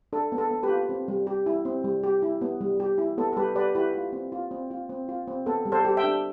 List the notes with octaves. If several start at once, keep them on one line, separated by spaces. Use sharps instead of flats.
D4 A4
B3
A4
B3
G4 B4
F4
C4
G3
G4
E4
C4
G3
G4
E4
B3
G3
G4
E4
B3 A4
A4
G3 G4 B4
G4 B4 D5
E4 G4 B4
F4
C4
F4
C4
F4
C4
F4
C4
B3 A4
G3
A4 C5
G4
E5 G5
D4